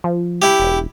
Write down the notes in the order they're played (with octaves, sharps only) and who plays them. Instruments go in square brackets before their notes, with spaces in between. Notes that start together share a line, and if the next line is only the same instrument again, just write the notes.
[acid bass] F3
[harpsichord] E4 G4
[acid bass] E1